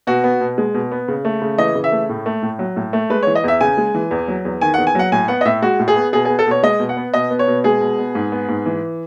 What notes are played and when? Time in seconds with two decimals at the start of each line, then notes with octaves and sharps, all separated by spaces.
0.07 B2 F#4
0.24 B3
0.41 B2
0.58 G#3
0.74 B2
0.91 B3
1.08 C#3
1.25 A3
1.42 C#3
1.58 E3 D#5
1.75 C#3
1.84 E5
1.92 A3
2.09 A2
2.26 A3
2.42 A2
2.59 F#3
2.76 A2
2.93 A3
3.10 G#3 B4
3.23 C#5
3.27 E3
3.35 D#5
3.44 E2 E5
3.61 C#3 G#5
3.78 G#3
3.95 E3
4.11 E2
4.28 F#3
4.45 E2
4.61 D#3 G#5
4.74 F#5
4.78 E2
4.87 G#5
4.95 F#3 F#5
5.12 A2 G#5
5.28 B3 F#5
5.41 D#5
5.45 A2 E5
5.62 G#3 F#4
5.79 A2
5.88 G#4
5.96 B3
6.13 B2 G#4
6.25 G#4
6.29 B3
6.39 A4
6.47 B2 C#5
6.63 G#3 D#5
6.80 B2
6.89 F#5
6.97 B3
7.14 B2 D#5
7.30 B3
7.39 C#5
7.48 B2
7.64 G#3 G#4
7.81 B2
7.99 B3
8.15 G#2
8.32 B3
8.49 G#2
8.66 E3